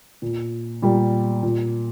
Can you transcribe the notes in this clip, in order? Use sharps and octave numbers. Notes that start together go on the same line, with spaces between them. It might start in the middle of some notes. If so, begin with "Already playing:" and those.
A#2
A#2 G3
A#2